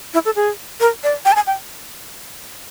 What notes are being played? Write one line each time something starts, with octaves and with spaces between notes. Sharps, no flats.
E4
A4
G#4
A#4
D5
G5
A5
G#5
G5